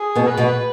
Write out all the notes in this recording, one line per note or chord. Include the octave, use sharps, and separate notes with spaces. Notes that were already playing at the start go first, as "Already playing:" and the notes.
Already playing: G#4
B2 B3
B4
B2 B3